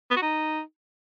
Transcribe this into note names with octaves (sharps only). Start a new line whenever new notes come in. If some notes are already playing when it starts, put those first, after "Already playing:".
B3
F#4
D#4